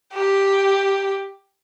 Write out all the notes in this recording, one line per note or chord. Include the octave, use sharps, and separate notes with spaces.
G4